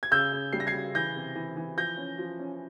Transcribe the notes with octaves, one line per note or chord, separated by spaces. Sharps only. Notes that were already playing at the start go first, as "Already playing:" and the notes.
G#6
C#3 E6 G6
C#3
G3 C7
A#6
G#6 C7
C#3
E3 G6 A#6
C3
E3
E3
F3 G6 A#6
C#4
F3
C#4